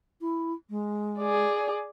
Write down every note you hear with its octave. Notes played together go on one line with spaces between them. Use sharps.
E4
G#3
G#4 D5